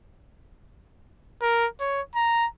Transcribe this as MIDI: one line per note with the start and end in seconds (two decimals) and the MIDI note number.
1.42 1.67 70
1.80 2.01 73
2.15 2.47 82